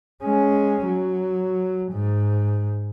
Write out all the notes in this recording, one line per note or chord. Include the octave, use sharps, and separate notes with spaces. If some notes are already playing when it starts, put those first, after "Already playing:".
G#3 C#4
F#3
G#2